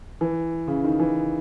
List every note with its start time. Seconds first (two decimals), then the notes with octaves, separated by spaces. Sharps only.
0.21 E3
0.68 C#3
0.84 D#3
1.00 E3